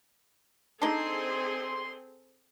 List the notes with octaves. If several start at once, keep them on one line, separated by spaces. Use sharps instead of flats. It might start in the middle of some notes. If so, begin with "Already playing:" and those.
C4 D4 D#4 G#4 A4 C6